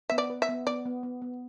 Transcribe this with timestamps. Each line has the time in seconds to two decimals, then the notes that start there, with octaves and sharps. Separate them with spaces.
0.10 B3 E5
0.18 D5
0.30 B4
0.42 E5
0.49 B3
0.67 B3 D5
0.86 B3
1.03 B3
1.22 B3